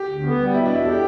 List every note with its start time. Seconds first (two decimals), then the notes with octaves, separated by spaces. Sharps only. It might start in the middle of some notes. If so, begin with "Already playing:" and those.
Already playing: G4
0.08 D2
0.24 B3
0.38 G3
0.54 B2 E4
0.66 D4
0.70 E2 E4
0.85 G4 A4